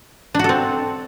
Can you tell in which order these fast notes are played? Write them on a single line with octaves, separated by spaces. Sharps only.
D4 F#4 A4 C4